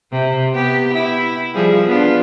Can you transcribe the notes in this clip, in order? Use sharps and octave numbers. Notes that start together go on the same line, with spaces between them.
C3
B3 G4
E4
F3 G3 G#4
B3 D4 F4